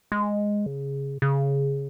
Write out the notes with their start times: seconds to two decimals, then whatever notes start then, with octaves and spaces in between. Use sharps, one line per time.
0.12 G#3
0.66 C#3
1.22 C#3